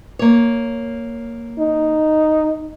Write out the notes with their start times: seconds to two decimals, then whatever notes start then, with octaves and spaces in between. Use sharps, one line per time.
0.19 A#3 C#5
1.59 D#4